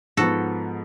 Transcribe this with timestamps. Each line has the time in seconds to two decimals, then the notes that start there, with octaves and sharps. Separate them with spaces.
0.17 G#2 F3 B3 F#4 A4